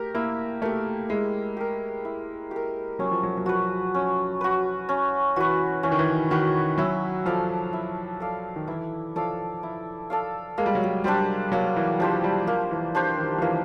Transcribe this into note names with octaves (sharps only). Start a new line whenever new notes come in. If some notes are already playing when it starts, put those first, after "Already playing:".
Already playing: A3 G4 A#4
A#3 E4
A3 G4 A#4
G#3 E4
G4 A#4
E4
G4 A#4
F#3 C#4
F3
F#3
F#3
F3 F#4 B4
C#4
F#4 B4
C#4
E3 F#4 B4
E3 C#4
D#3
E3
D#3 F#4 B4
F#3 E4
F3 A4 D5 F5
E4
A4 D5 F5
D#3
E3 E4
F3 A4 D5 F5
E4
A4 D5 F5
G#3 A#3
G3
F#3
G3
G3 D4 G4 C5
F#3 A#3
E3
F3 D4 G4 C5
G3
F3 A#3
E3
D4 G4 C5
D#3
F3
E3 A#3